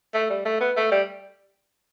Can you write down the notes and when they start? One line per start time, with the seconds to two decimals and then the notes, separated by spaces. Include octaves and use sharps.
0.14 A3
0.30 G3
0.45 A3
0.61 B3
0.77 A3
0.91 G3